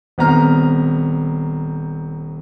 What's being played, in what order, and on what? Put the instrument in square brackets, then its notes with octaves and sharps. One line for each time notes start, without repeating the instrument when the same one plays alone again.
[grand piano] D#1 B3 C4 A#5 F6